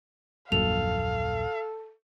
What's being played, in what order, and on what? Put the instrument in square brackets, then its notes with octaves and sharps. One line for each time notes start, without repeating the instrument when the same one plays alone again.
[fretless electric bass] D#1 A#1 F#2 [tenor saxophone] A4 [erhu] F5 [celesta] F7